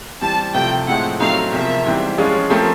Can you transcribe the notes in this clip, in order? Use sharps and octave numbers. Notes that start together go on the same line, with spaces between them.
E3 G3 C4 A5
C3 F3 A3 G5
A2 F3 G#3 C4 E4 F#5
F#3 A3 C4 D#4 F5
E2 C3 F3 A#3 E5
G#2 E3 G3 C4
F3 G#3 C#4 F4 G#4
F3 A3 C4 F4 A#4